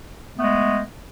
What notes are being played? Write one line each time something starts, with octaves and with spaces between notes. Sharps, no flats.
G#3 A3 B3